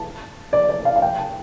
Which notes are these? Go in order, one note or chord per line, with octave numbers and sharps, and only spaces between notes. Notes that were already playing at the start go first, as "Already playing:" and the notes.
Already playing: A5
D5
D5
F5
F5
G5
A5